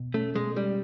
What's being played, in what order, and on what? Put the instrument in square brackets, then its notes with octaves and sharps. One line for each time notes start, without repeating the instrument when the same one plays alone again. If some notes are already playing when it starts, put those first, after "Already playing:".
Already playing: [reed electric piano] B2
[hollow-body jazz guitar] A3 [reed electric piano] C#4
[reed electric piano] B2 [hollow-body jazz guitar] G#3
[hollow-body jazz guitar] G3 [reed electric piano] G#3